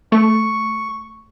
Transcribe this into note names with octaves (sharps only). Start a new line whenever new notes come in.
A3 C#6